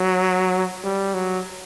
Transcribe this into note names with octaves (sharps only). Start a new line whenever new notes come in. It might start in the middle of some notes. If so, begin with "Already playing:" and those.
Already playing: F#3
G3
F#3